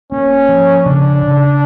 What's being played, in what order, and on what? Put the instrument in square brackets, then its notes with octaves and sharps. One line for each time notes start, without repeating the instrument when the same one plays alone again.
[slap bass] A#3 [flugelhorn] C#4
[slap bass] F3
[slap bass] C#3 [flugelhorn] D4
[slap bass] C#3